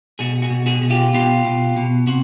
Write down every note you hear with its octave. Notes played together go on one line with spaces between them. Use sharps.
B2 F#4 G#4
F#4 G#4
B2
F#4 G#4
B2
F4 G4
B2 F4 G4
B2
B2
C3 F#4